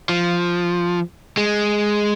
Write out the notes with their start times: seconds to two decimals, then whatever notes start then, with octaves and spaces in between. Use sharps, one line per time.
0.09 F3
1.37 G#3